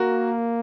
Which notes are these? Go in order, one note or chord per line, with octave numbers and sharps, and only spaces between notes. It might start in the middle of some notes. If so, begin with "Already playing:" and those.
Already playing: A#3 F#4 A#4